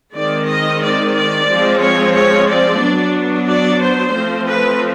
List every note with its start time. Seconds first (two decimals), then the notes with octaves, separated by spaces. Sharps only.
0.15 D#3 G#3 C4 D5
0.49 D#5
0.82 D5
1.15 D5
1.49 F3 G#3 C4
1.82 C#5
2.15 C#5
2.49 D5
2.82 F#3 B3 D4
3.48 D5
3.81 C5
4.15 F3 A3 C4
4.48 B4